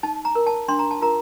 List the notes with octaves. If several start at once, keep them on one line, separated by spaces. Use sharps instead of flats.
D#4 A5
A#5
A#4
A5
D4 C6
A#5
A5
F4 A#4 A#5